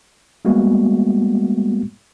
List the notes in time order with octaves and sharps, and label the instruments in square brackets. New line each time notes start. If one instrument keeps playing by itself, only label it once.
[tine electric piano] G3 G#3 A#3 B3 F#4